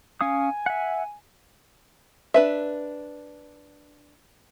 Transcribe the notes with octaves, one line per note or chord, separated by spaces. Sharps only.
C#4 F5 G#5 D#6
E5 F#5
D4 B4 E5